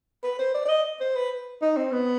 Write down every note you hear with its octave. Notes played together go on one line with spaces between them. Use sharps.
B4
C5
D5
D5
D#5
C5
B4
D#4
C4
B3